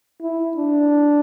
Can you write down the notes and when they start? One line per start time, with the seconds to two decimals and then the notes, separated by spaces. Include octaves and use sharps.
0.21 E4
0.57 D4